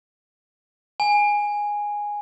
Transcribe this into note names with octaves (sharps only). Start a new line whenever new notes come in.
G#5